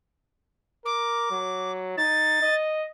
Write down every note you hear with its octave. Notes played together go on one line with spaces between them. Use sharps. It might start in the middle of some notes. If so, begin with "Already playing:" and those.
A#4 D6
F#3
D#4 A6
D#5